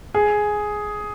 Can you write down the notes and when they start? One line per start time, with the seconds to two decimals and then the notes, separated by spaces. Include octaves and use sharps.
0.14 G#4